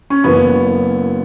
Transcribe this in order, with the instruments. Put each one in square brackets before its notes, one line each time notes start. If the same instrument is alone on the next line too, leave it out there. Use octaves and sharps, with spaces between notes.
[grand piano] C#4
[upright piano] F#1 F#2 E3 [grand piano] B3